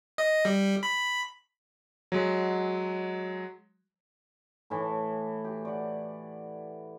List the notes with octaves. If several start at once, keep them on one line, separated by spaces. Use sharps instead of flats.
D#5
G3
B5
F#3 G#3
A2 E3 A5
G4
D5 F#5